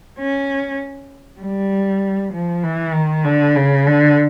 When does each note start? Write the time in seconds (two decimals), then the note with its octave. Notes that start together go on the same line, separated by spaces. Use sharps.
0.19 C#4
1.41 G3
2.33 F3
2.63 E3
2.94 D#3
3.25 D3
3.56 C#3
3.87 D3